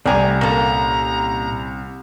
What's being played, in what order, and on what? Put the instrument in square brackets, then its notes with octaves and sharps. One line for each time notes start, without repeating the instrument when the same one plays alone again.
[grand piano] C2 [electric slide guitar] A3 G5 [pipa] D5 G#5 [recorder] A#5
[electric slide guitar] A#2 C#4 [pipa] A#3 A4 [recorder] A#5